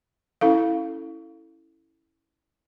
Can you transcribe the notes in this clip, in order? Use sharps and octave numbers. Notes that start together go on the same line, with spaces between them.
C#4 E4 A4 F5